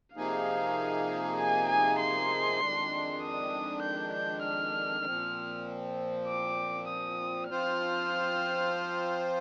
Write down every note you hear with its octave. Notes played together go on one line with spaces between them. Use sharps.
C3 F3 A#3 D#4 G#4 F5
G#5
G#5
C6
F2 D#3 G#3 D4
D#6
G6
G6
F6
A#2 F3 C4
D6
D#6
F3 C4 F4 C5 F6